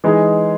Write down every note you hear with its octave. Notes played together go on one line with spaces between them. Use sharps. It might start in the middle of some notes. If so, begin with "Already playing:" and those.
E3 G#3 D#4 G#4